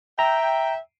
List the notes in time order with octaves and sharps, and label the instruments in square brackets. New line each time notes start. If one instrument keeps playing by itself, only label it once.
[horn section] E5 G5 [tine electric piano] A#5